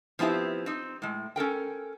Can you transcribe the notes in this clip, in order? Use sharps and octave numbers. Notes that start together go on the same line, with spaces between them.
F3 B3 C4 E4 G4
C4 D#4
A2 G#3
C#4 A4 A#4 G5